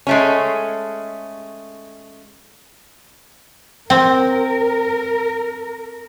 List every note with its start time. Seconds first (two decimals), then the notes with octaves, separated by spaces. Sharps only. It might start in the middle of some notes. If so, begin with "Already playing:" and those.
0.07 G#3 A3 C#4
3.90 C4 A#4